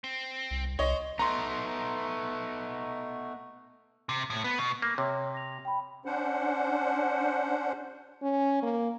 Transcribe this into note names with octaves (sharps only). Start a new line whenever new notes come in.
C4
C2
C2 C5 C#5 D#5
A3 B3 D#4 A#5 C6
C3
A2
B3
B2
A#3
C3 C#5
A#6 F7
G5 B5
C#4 D4 C5 F#5
C#4
A#3